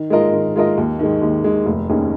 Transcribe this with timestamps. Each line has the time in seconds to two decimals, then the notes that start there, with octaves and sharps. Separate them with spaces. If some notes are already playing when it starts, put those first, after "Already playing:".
Already playing: D#3
0.10 G#3 F4 A#4 D#5
0.32 D#3
0.56 G#3 F4 A#4 D#5
0.77 D#2
0.99 D#3 G#3
1.22 D#2
1.44 D#3 G#3
1.66 F1
1.89 D#2 D#3 C#4 G#4